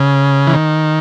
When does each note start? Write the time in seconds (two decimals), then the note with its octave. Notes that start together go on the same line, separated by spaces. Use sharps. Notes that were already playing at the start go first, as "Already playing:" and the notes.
Already playing: C#3
0.47 E3
0.53 D#3